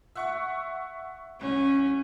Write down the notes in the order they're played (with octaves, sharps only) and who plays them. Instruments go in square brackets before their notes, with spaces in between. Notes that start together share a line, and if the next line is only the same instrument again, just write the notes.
[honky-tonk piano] E5 F#5 C#6
[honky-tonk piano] C2 [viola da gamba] C#4